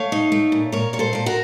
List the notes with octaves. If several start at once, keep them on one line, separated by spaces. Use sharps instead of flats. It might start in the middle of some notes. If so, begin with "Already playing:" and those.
Already playing: A3 C#5 F5
D#4
A3
A#2
A#2 A#4 C#5
A#2 C#5
A4 C5
A#2 A4
F#4 A#4